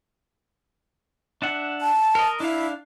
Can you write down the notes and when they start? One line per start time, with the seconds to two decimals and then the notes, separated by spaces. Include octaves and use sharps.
1.42 D4 E5 F#5
1.81 A5
2.15 A#4 D#5
2.40 D4 E4 F5